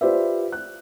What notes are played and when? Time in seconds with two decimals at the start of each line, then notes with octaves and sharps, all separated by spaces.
0.01 F4 G4 B4 C5 D5 E5
0.52 F#6